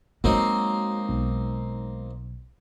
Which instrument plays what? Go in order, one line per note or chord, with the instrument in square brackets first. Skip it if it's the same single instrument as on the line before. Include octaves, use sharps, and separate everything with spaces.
[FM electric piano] F#3 [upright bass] G#3 [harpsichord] A#3 C4 D#4
[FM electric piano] B1